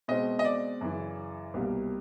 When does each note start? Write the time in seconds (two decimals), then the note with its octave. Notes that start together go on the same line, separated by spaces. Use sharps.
0.08 B2 G#3 C4 D#5
0.39 D#5
0.45 D5
0.81 F#2 C#3 E3
1.54 C2 B2 G3 A#3